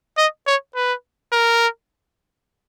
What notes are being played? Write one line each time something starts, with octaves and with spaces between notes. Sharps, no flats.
D#5
C#5
B4
A#4